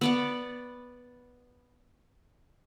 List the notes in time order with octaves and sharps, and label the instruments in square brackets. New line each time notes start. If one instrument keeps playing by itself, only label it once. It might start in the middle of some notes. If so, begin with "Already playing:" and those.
[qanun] B3 D5 F#5